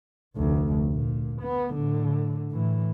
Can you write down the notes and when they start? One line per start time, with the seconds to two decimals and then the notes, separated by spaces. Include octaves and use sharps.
0.36 F1 D2
0.92 A#2
1.42 B3
1.74 A2 D3
2.51 A2 E3